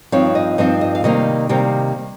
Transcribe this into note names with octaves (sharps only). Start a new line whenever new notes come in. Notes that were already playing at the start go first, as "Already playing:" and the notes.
G2 F3 C4 D#4 C#5
D#5
G2 F3 C4 D#4 D#5
D#5
F5
C3 D#3 G3 A#3 D#5
C3 D#3 G3 A#3 G5